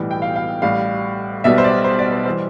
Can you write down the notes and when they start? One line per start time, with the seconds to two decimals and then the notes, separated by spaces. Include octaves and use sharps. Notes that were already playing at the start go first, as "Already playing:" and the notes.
Already playing: B1 A2 E3 G3
0.11 G5
0.22 F5
0.36 F5
0.62 A1 A2 G3 F5
1.44 B1 B2 G3 E5
1.58 C5
1.64 D5
1.84 C5
1.99 D5
2.12 C5
2.25 E3 G3 C5